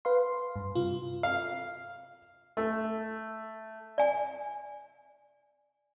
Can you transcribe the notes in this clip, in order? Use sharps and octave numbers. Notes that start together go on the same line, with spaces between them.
B4 F5 C6
G2
C3 F4
F5
A3
D5 G#5